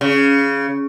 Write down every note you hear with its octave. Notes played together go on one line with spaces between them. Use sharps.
C#3